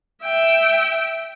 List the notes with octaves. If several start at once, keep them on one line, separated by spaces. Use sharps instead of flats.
E5 G5